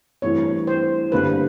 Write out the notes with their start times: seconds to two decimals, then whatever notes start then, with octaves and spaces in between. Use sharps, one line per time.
0.22 G2 E3 A3 C4 E4 C#5
0.67 C5
1.12 G2 D3 G3 A#3 B4